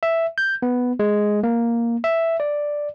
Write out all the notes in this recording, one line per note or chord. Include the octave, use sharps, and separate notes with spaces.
E5
G6
B3
G#3
A#3
E5
D5